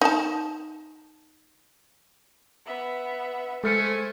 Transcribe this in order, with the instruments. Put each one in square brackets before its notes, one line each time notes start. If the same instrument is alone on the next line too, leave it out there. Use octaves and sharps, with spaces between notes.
[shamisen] D#4 A5
[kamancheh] B3 E5
[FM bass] G#3 [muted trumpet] A3 [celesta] A4 F6 C#7 [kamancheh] C5 G#5